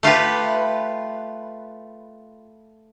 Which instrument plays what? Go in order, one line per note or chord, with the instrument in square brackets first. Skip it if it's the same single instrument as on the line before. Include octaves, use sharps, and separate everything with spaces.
[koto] A3 F4 G4 B4